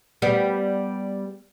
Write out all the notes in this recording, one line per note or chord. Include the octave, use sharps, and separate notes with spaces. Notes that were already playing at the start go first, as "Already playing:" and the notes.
G3 B3